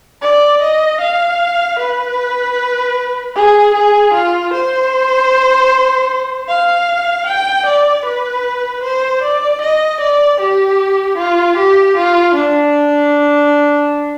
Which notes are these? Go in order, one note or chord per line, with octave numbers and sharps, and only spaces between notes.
D5
D#5
F5
B4
G#4
G#4
F4
C5
F5
G5
D5
B4
C5
D5
D#5
D5
G4
F4
G4
F4
D4